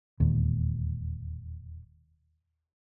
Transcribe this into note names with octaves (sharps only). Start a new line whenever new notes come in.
E1 D#2 A#2